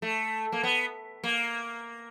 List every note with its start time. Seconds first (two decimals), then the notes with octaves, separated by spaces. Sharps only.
0.02 A3
0.52 A#3
0.63 B3
1.24 A#3